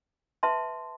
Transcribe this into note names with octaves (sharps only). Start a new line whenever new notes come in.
B4 E5 A5 C6